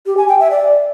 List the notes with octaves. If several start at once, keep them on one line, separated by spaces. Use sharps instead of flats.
G4
G#5
G5
E5
D5